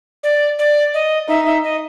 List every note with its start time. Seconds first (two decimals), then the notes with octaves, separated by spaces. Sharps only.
0.23 D5
0.59 D5
0.94 D#5
1.29 D#4 E5
1.46 E5
1.64 D#5